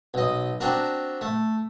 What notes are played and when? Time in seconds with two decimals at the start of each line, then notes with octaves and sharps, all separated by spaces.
0.14 B1 D#5
0.60 C4 D4 F#4 A#4
1.21 A3